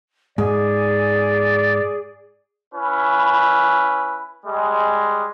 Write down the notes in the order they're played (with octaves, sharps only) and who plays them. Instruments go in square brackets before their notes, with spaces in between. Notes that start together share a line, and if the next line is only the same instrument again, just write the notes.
[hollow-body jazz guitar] G#2 [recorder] G#4 [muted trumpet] D5
[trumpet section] C#4 E4 B4
G3 G#3